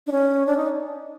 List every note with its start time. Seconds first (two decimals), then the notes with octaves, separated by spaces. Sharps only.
0.07 D4
0.12 C#4
0.47 D4
0.57 D#4